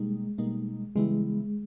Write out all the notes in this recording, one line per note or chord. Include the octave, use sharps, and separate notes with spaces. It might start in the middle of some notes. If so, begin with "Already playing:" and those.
Already playing: B2 G3 G#3 A#3 D#4
B2 G3 A#3 D#4
C#3 E3 G3 G#3 B3 E4